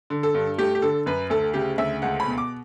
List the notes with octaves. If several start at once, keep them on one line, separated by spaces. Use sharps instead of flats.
D3
A4
G2
A3 G4
G4
D3 A4
F#2 B4
D2 A4
C#3 G4
D2 E5
C#2 F#5
B5
B2
D6